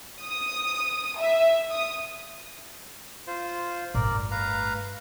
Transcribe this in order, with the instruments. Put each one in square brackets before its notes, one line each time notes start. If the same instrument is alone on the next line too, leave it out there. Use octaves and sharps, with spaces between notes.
[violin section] D#6
E5
D#6
[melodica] F4 C5
[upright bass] G1 A2 [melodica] A#4 D5
[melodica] B4 F5 A#5